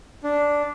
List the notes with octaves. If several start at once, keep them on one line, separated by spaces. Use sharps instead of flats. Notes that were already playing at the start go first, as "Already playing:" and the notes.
D4